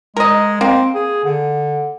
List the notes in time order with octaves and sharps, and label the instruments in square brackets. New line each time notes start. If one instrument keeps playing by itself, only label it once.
[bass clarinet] G#3 [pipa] A#4 D#5
[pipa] A#3 [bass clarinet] C4
[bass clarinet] G#4
D3